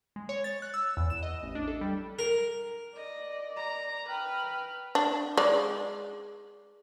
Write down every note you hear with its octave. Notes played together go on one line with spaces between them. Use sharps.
G#3
C#5
A6
F#6
E6
E2
E7
D#5
A1
D4
A4
G3
A#4
D5 D#5
A#5
B4 G5 F6
D4
G#3 D5